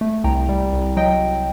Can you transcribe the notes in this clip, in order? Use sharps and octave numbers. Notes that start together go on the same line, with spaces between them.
A3
C2 G5 A#5
G3
C2
F#3 D#5 G5